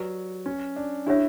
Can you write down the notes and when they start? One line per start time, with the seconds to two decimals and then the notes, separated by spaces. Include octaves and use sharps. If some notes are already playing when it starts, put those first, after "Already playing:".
Already playing: F#3 G4 B4 D5 A#5
0.46 C#4
0.76 D4
1.06 D4 E4 G4 C#5 E5